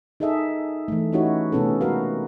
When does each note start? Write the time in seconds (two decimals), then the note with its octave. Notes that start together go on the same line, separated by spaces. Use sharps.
0.20 D#4 G#4 A4 D#5 E5
0.88 E3 A3
1.12 C#4 D#4 E4 F#4 G4 C#5
1.52 C3 A3 B3 C#4 G#4 A4
1.81 G#3 C#4 F#4 A#4 B4 F5